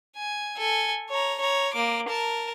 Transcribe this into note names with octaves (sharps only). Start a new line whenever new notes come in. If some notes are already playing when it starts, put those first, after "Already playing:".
G#5
A4 G#5
C#5 A#5
C#5 A#5
A#3 D6
A#4 A5